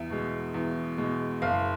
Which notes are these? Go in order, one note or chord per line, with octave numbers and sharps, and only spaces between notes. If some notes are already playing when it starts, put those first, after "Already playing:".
Already playing: E2 E5
B2 G#3
E2
B2 G#3
F#1 F5